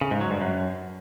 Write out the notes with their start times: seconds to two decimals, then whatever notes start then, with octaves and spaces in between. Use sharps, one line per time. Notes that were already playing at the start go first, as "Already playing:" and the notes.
0.01 C#3
0.11 G#2
0.21 F#3
0.31 G2
0.41 F#2